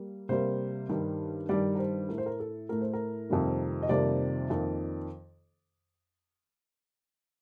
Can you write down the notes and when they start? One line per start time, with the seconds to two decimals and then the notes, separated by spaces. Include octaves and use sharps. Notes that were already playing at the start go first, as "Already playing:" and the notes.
Already playing: G3 A#3
0.29 C3 G3 A#3 C5
0.89 G2 D#3 G3
1.49 G2 D#3 G3 D5
1.75 A#4
1.79 C5
2.09 A2 A3 A#4
2.18 C5
2.26 A#4
2.40 A4
2.69 A2 A3 A#4
2.81 C5
2.93 A#4
3.29 F2 C3 D#3 G3 A#3
3.83 D#5
3.89 F2 C3 D#3 G3 A#3 D5
4.50 F2 D#3 A#3